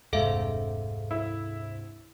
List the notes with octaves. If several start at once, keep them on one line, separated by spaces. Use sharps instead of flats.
F1 D2 G#2 C3 G#3 A4 E5 F5
E4